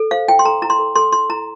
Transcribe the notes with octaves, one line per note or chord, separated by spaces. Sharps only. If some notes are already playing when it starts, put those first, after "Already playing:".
Already playing: A4
C5 F5
E4 G5
C6
A4 A#5
E4 A#5
C6
A4
A4 C6
E4 C6
E4 A#5